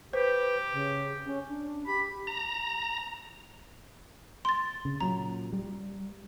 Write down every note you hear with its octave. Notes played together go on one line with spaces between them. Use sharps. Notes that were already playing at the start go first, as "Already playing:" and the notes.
G4 B4 C5
C#3
C#4
D4
G4 B5
A#5
C6 A6
C#3
A#2 F#3 C#4 A#5
G3